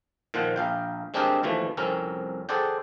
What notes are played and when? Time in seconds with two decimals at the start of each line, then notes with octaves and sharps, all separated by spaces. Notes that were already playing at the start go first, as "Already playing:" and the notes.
0.34 A#2 D#3 F3 C5 F#5
0.56 A#1 F5 G5
1.14 G#3 C4 D4 G4 G#4 A#4
1.43 D#2 B2 E3 F3 A3
1.77 C2 F2 C4 C#4 A#4
2.49 G#4 A4 C5 D5 F#5 G5